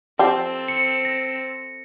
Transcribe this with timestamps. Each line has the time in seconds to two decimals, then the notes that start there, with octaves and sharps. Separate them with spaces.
0.19 F3 C4 G4 A4
0.68 C#7
1.05 A#6